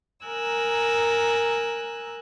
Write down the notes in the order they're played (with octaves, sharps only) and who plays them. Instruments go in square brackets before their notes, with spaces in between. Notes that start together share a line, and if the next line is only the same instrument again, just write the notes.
[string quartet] A#4 G#5 A#5 E6 F#6